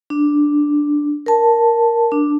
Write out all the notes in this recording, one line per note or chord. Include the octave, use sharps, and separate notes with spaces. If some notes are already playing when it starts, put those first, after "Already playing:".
D4
A#4 A5
D4